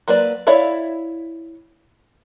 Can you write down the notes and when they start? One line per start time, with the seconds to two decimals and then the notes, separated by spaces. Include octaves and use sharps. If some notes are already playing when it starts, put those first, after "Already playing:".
0.08 F#3 A#3 B4 D5
0.47 E4 C#5 D5 E5 F5